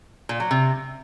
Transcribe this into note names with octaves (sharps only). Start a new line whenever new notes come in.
A#2
F#3
C3